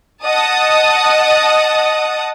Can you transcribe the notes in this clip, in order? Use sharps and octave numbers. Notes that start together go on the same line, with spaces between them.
D#5 F#5 A5 D#6